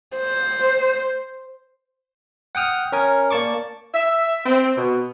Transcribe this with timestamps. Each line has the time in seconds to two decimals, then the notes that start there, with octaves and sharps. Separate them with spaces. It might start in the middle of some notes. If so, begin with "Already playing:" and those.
0.16 C5
2.55 F#5 G5 D#6 F6
2.92 C#4 A#4 G#5
3.30 A#3 D5 A5 C#6 D6
3.94 E5
4.46 C4
4.77 B2